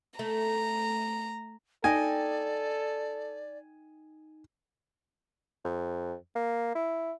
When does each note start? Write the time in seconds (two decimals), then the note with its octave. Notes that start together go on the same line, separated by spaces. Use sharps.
0.19 A3 A#5
1.84 D#4 A4 D5 D#5 G5 G#5
5.65 F2
6.36 A#3
6.75 E4